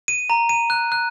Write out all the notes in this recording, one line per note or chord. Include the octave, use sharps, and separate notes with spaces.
D#7
A#5
D#7
F#6
F#6